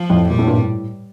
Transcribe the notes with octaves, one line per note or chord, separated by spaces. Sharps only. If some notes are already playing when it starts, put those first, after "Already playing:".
Already playing: F3
F2 A2
A#2 G3
A2
G2 A#2
A2